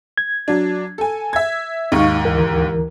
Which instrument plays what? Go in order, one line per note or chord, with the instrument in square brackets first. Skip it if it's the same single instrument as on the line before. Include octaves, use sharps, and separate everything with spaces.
[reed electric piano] G#6
[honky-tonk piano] F#3 D4
A4 G#5
E5 G#6
[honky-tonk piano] D#2 G#2 [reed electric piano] D#4 F5 C#6
[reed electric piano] D2 E3 A#4